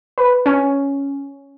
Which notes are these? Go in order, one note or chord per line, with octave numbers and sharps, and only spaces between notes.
B4
C#4